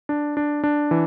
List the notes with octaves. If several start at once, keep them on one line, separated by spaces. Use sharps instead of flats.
D4
D4
D4
E3